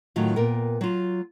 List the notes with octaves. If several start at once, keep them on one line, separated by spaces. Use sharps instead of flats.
A2 D#3 F#3 F4
A#2 B3 A#4 G5
F#3 F4